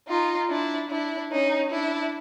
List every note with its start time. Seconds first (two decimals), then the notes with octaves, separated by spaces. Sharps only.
0.08 D#4 F4
0.49 D4 E4
0.89 D4 E4
1.30 C#4 D#4
1.71 D4 E4